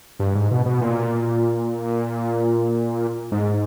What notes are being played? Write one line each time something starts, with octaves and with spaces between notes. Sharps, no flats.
G2
G#2
B2
B2
A#2
G#2